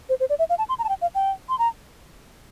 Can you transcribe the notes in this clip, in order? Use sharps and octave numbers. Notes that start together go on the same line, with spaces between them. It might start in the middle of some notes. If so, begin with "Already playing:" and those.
C5
C5
D5
E5
F5
A5
C6
A#5
A5
G5
F5
G5
C6
A#5